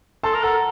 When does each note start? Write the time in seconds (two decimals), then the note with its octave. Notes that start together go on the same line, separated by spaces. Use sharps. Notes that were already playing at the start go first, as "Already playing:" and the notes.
0.23 A4 A5 C6
0.34 A#4
0.43 A4 F#5 A#5